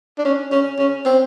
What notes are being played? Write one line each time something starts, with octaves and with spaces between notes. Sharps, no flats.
D4
C#4
C#4
C#4
C4